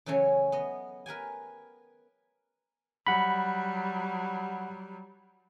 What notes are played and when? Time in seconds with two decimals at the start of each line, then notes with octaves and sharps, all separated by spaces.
0.06 C#3 E3 F#3 A3 C#4
0.52 B3 D#5
1.06 A#4 B4 G5 G#5
3.07 F#3 G3 F#5 B5